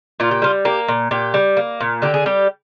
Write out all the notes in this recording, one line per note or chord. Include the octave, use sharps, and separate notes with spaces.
A#2 F4
G4
G3 F4
A#3 G4
A#2
A#2 G4
G3
A#3
A#2
D3 G4
G#4
G3 G4